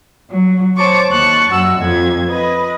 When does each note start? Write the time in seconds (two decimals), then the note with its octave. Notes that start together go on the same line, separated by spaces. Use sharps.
0.30 F#3
0.76 C5 C#5 A5 C#6 D6
1.10 D#2 A5 C#6 F#6
1.50 F#2 F#4 E6
1.78 F2 G#6
2.27 B4 D#5 B5